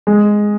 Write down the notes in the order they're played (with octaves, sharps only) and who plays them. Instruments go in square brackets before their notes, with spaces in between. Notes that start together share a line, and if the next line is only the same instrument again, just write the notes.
[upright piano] G#3